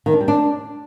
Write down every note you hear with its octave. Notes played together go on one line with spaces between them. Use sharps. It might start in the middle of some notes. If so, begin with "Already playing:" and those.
D#3
D4
G3
D4